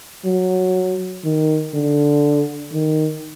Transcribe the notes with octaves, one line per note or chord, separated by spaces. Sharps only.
F#3
D#3
D3
D#3